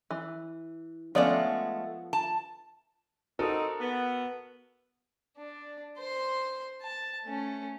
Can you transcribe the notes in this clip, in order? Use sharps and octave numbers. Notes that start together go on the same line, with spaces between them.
E3
F3 G#3 A3 B3 C#4 D5
A5
C4 D#4 F#4 A4 A#4
B3
D4
C5 C6
A5
A3 C#4